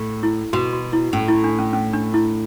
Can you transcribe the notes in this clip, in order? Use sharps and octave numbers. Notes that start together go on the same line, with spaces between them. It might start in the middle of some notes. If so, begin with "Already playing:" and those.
Already playing: A2
E4
B2 F#4
F#4
E4
A2 C#4
E4
D4
C#4
C#4
D4
E4